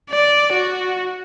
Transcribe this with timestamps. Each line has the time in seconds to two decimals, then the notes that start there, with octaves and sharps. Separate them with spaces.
0.10 D5
0.53 F#4